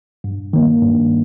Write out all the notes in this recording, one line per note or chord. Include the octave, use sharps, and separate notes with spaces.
G2
D#3 A#3
G2